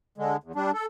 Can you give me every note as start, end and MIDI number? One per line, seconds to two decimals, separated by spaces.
0.18 0.37 50
0.18 0.37 56
0.43 0.52 40
0.55 0.71 55
0.55 0.71 62
0.74 0.86 69